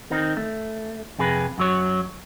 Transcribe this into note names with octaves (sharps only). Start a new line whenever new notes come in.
D#3 C4 D#4
A3
F2 C3 G#4 B4
F#2 F#3 C#5